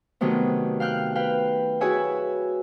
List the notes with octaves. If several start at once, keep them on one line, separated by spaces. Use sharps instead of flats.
C3 D#3 F#3 A3 B3
F5 G5 F6 F#6
B4 F5 G5
E4 F#4 G#4 C#5 E5 G#5